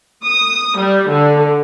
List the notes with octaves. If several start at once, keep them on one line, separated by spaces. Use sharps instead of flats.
D#6
G3
D3